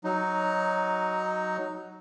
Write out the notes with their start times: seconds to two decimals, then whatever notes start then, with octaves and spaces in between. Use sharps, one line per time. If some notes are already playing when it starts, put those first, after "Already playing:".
0.04 F#3 D#4